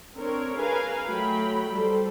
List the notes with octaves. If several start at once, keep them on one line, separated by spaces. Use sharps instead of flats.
C4 D4 A#4 C#5
G#4 A#4 B4 F5 G#5
F#3 A3 G5 B5
G3 A4 C5